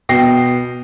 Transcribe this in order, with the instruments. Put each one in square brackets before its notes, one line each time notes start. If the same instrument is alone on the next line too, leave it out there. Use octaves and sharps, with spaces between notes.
[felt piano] B2 G5 A#6 C7